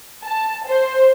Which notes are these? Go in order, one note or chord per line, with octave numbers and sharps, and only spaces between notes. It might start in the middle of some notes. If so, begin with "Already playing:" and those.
A5
C5